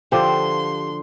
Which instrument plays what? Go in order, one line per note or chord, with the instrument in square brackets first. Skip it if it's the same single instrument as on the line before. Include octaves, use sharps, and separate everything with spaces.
[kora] D3 F3 C5 [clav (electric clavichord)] G4 [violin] C6